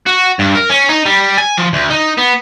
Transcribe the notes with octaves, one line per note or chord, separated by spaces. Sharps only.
F#4
G2
A#4
C#4
D#4
G3
G#5
F3
D2
D#4
B3